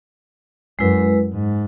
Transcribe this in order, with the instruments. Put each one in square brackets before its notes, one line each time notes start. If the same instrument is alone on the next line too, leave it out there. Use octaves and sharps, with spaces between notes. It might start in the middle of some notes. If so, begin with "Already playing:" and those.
[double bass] F#2 [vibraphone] G#3 E4 B4
[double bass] G#2